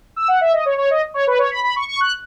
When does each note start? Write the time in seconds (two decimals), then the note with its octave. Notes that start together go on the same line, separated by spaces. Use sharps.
0.16 E6
0.28 F#5
0.41 E5
0.53 D#5
0.66 C#5
0.78 C#5
0.91 D#5
1.14 C#5
1.27 B4
1.39 C#5
1.51 B5
1.64 B5
1.76 C#6
1.88 C#6
2.01 F#6